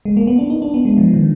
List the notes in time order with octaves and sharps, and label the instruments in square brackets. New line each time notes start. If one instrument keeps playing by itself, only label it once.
[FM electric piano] G#3
A#3
B3
D4
D#4
D4
B3
G#3
F3
D#3